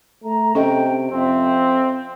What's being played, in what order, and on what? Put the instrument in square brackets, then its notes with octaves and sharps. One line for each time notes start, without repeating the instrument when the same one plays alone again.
[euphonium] A3 [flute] A#5
[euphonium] C3 [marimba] C#4 A4 D#5 [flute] G5
[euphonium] F2 [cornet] C4 [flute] E5